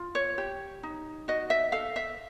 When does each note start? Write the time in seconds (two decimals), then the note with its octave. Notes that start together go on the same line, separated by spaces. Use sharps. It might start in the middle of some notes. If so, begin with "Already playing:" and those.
Already playing: F4
0.15 C#5
0.38 G4
0.83 D#4
1.28 F#4 D#5
1.50 E5
1.72 A4 F5
1.96 E5